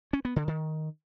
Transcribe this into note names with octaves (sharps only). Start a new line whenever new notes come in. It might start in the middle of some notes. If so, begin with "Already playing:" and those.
C#4
B3
D3
D#3